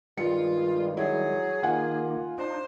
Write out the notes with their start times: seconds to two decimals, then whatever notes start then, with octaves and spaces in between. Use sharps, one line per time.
0.18 G2 D#3 G3 G#3 F4 C#7
0.97 F#3 E4 G#4
1.63 D#3 A#3 D#4 F4 F#5 G#5
2.38 D4 D#4 C5